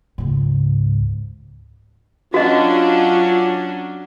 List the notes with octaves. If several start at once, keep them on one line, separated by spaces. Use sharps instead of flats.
C#2 G#2
F#3 C#4 D4 F4 F#4 D#5